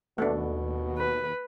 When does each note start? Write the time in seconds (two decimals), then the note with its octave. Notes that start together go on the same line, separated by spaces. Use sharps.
0.18 D#2 B2 A3 B3 D4
0.98 B4